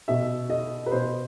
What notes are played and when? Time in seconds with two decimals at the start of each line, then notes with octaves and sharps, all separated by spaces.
0.08 B2 E5
0.50 D#5
0.86 B4
0.92 B2 C5